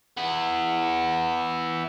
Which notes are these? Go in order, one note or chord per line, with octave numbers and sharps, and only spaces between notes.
B3 E4